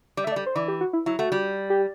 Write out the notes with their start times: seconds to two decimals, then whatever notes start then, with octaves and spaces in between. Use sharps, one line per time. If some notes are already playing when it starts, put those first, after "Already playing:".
0.17 G3 D5
0.24 E5
0.27 A3
0.32 D5
0.36 G3
0.46 C5
0.55 E3 D5
0.68 G4
0.81 F#4
0.93 E4
1.06 F#3 E4
1.19 A3 F#4
1.32 G3
1.70 G4